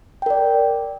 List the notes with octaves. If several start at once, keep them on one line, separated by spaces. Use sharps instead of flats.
A#4 D5 G5